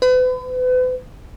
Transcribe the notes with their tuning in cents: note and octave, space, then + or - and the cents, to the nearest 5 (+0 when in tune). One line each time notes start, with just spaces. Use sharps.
B4 +40